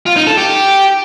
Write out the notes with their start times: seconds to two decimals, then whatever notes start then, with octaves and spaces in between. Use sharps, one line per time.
0.06 F4
0.16 D#4
0.27 A4
0.38 G4